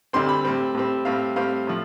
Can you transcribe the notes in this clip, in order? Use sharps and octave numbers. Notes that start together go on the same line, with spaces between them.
D2 D3 G3 C4 C6
B5
A2 G3 C4
A2 G3 C4
A2 G3 C4 F5
A2 G3 C4 F5
A2 F3